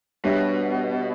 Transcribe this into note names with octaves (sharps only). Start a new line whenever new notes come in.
B2 G3 D4 G4 C#5 E5